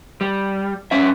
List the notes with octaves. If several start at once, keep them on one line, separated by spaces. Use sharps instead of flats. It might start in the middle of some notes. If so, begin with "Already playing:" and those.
G3
G2 C#4 E5